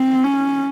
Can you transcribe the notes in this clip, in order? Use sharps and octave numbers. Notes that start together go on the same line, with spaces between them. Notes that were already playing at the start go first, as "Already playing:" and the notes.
Already playing: C4
C#4